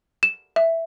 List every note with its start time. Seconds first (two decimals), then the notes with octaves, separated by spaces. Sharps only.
0.23 E7
0.56 E5